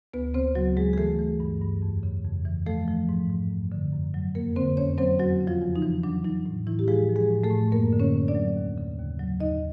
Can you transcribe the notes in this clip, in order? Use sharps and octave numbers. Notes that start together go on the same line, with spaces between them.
D2 B3 B4
C#3 C4 C5
D2 F#3 F#4
F#3 G#3 G#4
G#4
E3 A3 A4
E3
G2
G2
F2
C#3
F2
E3
F3 A3 A4
F3
G#2
G#2
F#2
D3
F#2
F#3
F2 A#3 A#4
D3 C4 C5
F2 C#4 C#5
F#3 C4 C5
E2 F#3 F#4
C#3
F3 F4
E2
D#4
E3
F#3 D4
F#3 D#4
A2
A2 E3 E4
G4
F3 G#3 G#4
F3
G#3 G#4
A2
A3 A4
A2
F#2 A#3 A#4
D3
C#4 C#5
F#2
D4 D5
F#3
D#2
C#3
D#2
F#3
D#2 D#4 D#5